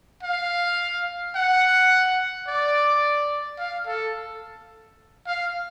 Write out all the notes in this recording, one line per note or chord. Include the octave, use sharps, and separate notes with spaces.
F5
F#5
D5
F5
A4
F5